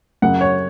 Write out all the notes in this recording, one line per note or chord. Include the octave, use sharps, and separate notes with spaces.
F#2 C#3 F#5
C#5